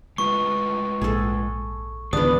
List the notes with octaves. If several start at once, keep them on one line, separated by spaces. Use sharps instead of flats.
G#3 F4 B4 C#6
A#1 G#2 G#4 A4
C#2 G#2 D3 E3 B3 D4 G#4 D#6